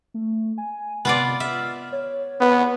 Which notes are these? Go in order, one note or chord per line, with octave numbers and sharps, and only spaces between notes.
A3
G#5
C3 B3 F4 D5
E5 F6
C#5
B3